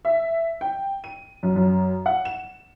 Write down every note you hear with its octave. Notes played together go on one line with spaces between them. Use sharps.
E5
G5
D#7
F#2
F#2
F#5
E7